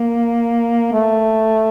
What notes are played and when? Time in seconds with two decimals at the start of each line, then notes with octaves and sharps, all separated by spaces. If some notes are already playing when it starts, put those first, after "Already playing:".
Already playing: A#3
0.93 A3